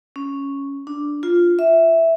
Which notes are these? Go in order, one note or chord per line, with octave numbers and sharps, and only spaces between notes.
C#4
D4
F4
E5